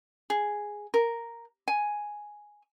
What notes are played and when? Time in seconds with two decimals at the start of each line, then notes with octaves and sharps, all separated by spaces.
0.30 G#4
0.94 A#4
1.68 G#5